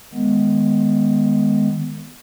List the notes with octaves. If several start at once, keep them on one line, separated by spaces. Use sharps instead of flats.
D#3 G#3 B3